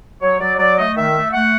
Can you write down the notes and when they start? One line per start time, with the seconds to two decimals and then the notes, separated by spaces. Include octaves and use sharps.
0.21 F#3 C#5
0.40 F#3 D5
0.59 F#3 D5
0.78 A3 D#5
0.96 D#3 E5
1.15 A3
1.33 A3 F#5